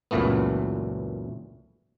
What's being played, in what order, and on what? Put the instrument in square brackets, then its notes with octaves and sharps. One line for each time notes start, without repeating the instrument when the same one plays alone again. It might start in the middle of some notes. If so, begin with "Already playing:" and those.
[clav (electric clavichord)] C#2 F#2 A#2 E3 A3 B3